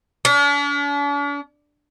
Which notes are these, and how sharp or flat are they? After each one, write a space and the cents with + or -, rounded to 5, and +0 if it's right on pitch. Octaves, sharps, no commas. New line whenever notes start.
D4 -45